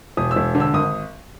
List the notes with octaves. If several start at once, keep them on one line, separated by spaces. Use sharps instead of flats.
E1 D#6
E6
E1
D3
E6
G#1 D#6